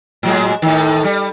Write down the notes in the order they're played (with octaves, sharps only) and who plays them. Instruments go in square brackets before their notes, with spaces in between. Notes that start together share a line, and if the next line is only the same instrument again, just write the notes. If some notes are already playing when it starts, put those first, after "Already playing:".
[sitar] A2 F#3 G#3
A2 D#3
G3